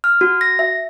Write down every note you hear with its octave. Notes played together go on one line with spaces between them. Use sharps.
F6
F#4
A#6
E5